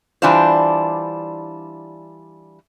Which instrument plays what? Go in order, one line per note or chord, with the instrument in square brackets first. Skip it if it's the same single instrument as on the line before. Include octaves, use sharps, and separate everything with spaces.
[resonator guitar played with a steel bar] E3 G3 D4 F4 C5